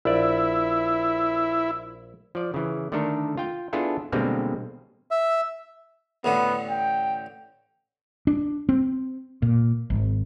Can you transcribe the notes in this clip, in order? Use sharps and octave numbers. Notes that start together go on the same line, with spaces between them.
A#1 E4 D5
F3 D5
C#3 E3
D3 D#3 A3 D4 A4 A#4
F4 G5
B3 D4 E4 F4 G#4 A4
B2 D3 G3 G#3 A#3 C4
E5
A1 D3 B3
G5
D4
C4
A#2
G#1